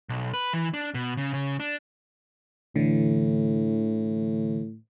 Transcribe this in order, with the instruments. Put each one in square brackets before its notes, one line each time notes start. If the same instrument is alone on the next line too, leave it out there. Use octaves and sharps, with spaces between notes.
[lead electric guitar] B1
B4
E3
D4
B2
C#3
C#3
D4
[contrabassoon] A2 [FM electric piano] D3 E3